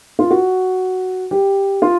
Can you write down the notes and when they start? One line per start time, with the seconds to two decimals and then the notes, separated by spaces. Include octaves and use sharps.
0.19 F4
0.31 F#4
1.31 G4
1.82 F4